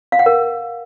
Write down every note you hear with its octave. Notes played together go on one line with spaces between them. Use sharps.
F5
F#5
A#4